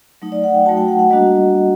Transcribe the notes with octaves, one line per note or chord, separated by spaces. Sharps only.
F#3 A3 D#4
D5
F#5
G5
F#3 A3 D#4 F#4 A5
G5
F#5
F#5
G3 A#3 D4 F#4 D#5